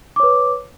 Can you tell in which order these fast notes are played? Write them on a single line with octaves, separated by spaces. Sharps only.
D6 C#5 B4